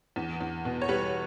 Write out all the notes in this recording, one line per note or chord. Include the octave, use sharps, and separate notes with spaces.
E2
E2
B2
C#5
G3 B4